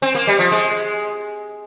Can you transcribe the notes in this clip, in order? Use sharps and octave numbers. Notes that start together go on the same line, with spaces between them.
C4
A#3
G3
F3
G#3